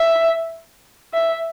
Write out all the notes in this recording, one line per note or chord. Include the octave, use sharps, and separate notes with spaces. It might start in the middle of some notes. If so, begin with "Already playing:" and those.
Already playing: E5
E5